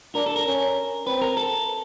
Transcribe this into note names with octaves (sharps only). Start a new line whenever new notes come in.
D4 A#4
A4
A#4
C#4
C4 B4
A#4
A4